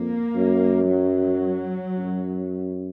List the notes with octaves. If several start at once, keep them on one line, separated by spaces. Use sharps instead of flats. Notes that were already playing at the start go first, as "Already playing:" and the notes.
Already playing: F2 A#3
F#2
F#3
F#2